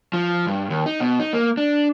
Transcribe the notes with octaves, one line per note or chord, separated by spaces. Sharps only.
F3
G2
D#2
D#4
B2
D#4
A#3
D4